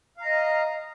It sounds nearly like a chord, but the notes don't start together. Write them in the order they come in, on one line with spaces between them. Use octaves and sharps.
F5 A#5 D#5